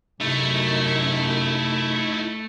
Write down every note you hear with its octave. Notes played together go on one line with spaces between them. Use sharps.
F#2 C3 A3 D#4 E4